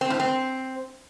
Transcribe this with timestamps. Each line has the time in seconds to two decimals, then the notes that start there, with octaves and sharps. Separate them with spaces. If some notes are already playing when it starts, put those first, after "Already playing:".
0.01 C4
0.10 A2
0.20 C4